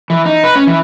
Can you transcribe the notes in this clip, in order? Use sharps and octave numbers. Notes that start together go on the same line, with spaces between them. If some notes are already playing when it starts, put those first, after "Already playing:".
E3
D#4
B4
C#4
E3